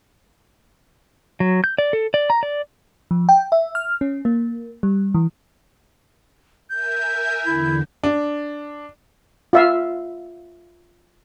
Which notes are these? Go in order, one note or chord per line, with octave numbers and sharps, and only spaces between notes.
F#3
G6
D5
A4
D5
A#5
D5
F3
G5
E5
F6
C#4
A#3
G3
E3
A#4 E5 G#5 G6
E2 D3 E4
D4
F4 E5 F5